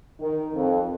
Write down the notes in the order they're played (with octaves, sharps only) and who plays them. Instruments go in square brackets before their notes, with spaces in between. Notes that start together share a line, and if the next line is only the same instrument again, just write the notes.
[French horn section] D#3
F2